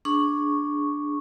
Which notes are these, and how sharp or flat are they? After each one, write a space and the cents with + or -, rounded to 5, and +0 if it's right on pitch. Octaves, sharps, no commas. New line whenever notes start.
D4 +0 G#4 +10 C#6 +0